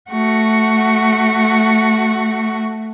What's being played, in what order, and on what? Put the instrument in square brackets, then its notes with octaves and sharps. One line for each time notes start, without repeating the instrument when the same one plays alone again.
[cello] A3 F#4